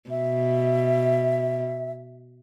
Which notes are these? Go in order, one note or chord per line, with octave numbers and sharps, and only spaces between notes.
B2 E5